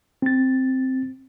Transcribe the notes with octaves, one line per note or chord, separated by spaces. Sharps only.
C4 A6